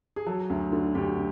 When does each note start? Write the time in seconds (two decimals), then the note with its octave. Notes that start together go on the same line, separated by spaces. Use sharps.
0.16 G#4
0.26 F#3 A4
0.50 D2
0.72 D3
0.95 D2 G4